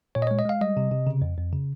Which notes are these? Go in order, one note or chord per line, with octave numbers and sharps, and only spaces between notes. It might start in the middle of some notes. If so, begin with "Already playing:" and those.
A#2 C#5
D#5
G#3 C#5
D#5
G#3 F5
G3 D#5
C3
C3
C#3
F2
F2
C#3